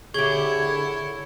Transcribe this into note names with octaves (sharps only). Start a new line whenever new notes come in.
D3 E4 G4 G#4 C#5 C#6 G#6 G7